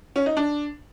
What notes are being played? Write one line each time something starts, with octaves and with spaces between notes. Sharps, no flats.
C#4
D#4
D4